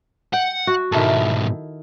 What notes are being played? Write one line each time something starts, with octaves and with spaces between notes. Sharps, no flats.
F#5 G5
F#4
G#2 B2 D#3 E4 A4